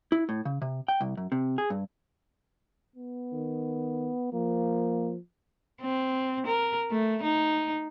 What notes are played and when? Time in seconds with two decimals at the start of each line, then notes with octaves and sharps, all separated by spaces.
0.12 E4
0.29 A2
0.45 C#3
0.62 C3
0.88 G5
1.01 C2
1.17 F#2
1.32 C3
1.58 G#4
1.70 G2
2.96 B3
3.33 D#3
4.33 F3 A#3
5.81 C4
6.47 A#4
6.91 A3
7.23 D#4